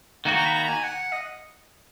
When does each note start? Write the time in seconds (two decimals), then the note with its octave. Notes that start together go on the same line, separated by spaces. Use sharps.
0.25 D#3 A#3 D#4 F#4 F#5
0.35 A#5
0.45 B5
0.55 A#5
0.69 G#5
0.84 F#5
1.12 D#5